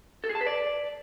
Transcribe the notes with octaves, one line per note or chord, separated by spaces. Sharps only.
A4
G#4
A5
B4
D5